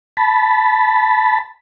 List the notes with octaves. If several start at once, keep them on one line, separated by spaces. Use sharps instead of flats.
A5 B5